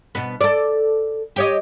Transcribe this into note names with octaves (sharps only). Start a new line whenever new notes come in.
B2 B3
A4 D5
G4 C#5 D#5